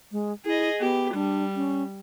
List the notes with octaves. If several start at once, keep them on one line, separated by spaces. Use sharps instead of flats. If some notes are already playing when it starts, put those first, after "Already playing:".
G#3
E4 G#4 D#5
B3 G4
G3 D4
C#4